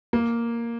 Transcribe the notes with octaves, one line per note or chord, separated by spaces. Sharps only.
A#3